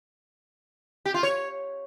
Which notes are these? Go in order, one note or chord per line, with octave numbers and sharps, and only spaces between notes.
G4
F4
C#5